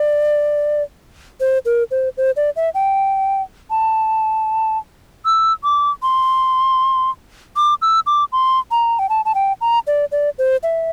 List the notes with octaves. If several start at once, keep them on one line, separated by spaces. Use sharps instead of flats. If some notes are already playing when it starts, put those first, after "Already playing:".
Already playing: D5
C5
A#4
C5
C5
D5
E5
G5
A5
E6
D6
C6
D6
E6
D6
C6
A#5
G5
A5
A5
G5
A#5
D5
D5
C5
E5